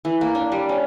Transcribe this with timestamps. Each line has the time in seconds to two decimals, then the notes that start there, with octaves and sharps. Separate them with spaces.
0.05 E3
0.21 A#3
0.35 D4
0.52 G3
0.69 C#4